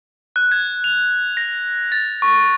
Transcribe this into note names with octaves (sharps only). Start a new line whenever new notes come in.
F#6
G#6
F7
A#6
A6
C#6